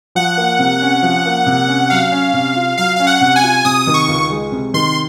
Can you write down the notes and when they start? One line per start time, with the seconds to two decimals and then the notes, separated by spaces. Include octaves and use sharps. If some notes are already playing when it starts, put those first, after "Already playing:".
0.15 F3 F#5
0.37 A#3
0.59 C3
0.82 C#4
1.03 F3
1.26 A#3
1.46 C3
1.68 C#4
1.90 F#3 F5
2.12 C#4
2.33 C3
2.56 F4
2.78 F#3 F5
2.96 C#4 F5
3.07 F#5
3.21 C3
3.36 G#5
3.43 F4
3.65 C3 D#6
3.87 D#3
3.94 C#6
4.08 C#2
4.30 G#3
4.52 C3
4.74 D#3 C6